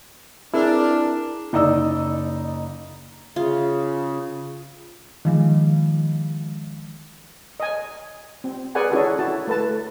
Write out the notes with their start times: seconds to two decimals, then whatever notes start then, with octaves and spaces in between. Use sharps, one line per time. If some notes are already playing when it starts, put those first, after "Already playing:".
0.54 C4 D4 E4 G#4 A#4
1.53 F#1 D#4 D5 D#5 E6
3.36 C#3 F4
5.25 D#3 F3 G#3
7.60 D#5 G#5
8.44 C4
8.75 G#4 A#4 B4 D5 F#5 G#5
8.91 C#4 D4 E4 F#4 G#4 A4
9.19 E4 F#4 A5
9.47 A3 B4 A5